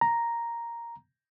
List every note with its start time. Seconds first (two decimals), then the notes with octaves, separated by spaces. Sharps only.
0.01 A#5